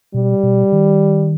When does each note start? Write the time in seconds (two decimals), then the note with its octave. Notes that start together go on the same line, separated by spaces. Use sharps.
0.14 B2 G3
0.43 B2
0.72 D#3